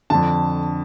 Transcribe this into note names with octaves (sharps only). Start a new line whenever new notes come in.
F2 D3 A5